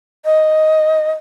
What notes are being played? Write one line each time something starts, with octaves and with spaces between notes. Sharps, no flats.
D#5